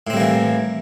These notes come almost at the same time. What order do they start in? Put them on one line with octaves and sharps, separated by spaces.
A2 C4 G3 A#3 E3